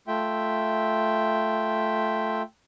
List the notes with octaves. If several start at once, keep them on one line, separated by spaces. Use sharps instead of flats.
A3 F4 E5 G5